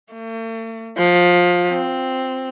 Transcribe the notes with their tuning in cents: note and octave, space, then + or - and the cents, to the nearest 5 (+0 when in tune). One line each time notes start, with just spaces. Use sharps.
A3 +45
F3 +20
C4 +0